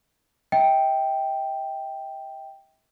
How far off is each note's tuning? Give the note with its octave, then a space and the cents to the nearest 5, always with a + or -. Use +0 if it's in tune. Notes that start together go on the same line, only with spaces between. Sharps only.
E5 -45 G5 +0